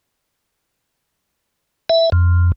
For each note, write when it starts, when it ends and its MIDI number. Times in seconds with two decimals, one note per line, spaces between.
1.89 2.10 76
2.12 2.52 41